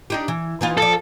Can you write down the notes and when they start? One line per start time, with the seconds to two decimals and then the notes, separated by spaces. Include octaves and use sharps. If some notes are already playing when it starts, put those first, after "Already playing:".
0.10 D4 D#4 G4
0.28 E3
0.61 E3 D#4 F4
0.78 F3 A4 D5